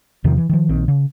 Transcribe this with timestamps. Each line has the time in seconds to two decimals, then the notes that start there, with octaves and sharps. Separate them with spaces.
0.24 E2 C3 D#3 F3
0.38 E3
0.49 D#3 F3
0.69 A#1 D#3 C4
0.88 C#3